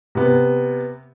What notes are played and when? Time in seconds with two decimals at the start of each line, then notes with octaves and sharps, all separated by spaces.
0.15 C3 B3